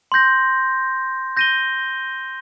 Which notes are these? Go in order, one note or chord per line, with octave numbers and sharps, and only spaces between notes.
C6 G6 A#6
G6 A#6 D#7 G7